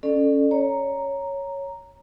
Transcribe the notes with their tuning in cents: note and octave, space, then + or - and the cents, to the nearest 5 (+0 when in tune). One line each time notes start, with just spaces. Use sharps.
C#4 +0 A4 +0 D5 +30
C#5 +0 A#5 +0